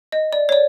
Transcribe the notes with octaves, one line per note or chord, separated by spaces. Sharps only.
D#5
D5
C#5
D5